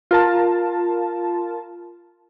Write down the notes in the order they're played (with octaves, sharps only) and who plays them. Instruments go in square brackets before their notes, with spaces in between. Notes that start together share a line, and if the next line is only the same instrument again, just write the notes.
[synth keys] F4 A#4 A5